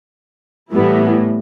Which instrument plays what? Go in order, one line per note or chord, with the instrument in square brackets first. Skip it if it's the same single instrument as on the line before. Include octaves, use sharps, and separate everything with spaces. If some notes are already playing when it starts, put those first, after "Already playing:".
[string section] A2 [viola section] E3 G3 B3 E4